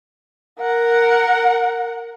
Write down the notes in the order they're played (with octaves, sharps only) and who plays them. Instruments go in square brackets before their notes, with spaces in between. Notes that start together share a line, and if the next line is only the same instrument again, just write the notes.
[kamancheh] A#4 F#5